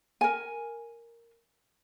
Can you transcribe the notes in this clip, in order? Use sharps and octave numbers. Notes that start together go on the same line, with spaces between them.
A#4 G#5